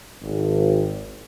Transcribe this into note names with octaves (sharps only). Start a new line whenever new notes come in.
G#1